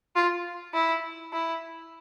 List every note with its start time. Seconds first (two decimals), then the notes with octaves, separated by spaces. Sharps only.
0.16 F4
0.74 E4
1.33 E4